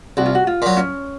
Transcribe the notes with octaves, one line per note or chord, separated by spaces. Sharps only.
C2 F#4
F4
F#4
F4
A#2 F#3
C#4